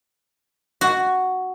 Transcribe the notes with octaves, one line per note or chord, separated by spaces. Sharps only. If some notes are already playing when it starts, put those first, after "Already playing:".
F#4